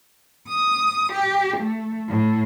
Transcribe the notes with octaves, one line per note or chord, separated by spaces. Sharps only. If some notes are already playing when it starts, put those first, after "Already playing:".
D#6
G4
A3
A2